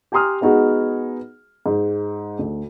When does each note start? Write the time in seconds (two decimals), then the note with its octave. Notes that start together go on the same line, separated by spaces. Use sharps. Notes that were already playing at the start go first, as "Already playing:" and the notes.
0.12 G4 G#5 A#5 C6 D#6 F6
0.41 G#3 B3 D#4 F#4 G#4
1.66 G#2
2.39 D2